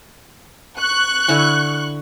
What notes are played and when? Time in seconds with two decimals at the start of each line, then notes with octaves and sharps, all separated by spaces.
0.79 C#6 F#6
1.28 D3 E4 G#5